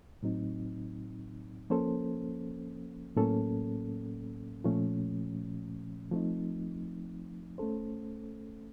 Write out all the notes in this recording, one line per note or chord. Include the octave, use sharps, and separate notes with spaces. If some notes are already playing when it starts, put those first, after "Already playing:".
A2 F#3 C4 D#4
F3 A#3 C#4 A4 C5
A2 F#3 A#3 C#4 A4
A#2 F3 A3 C#4
F3 A3 C4 D#4
A3 C#4 A4 C5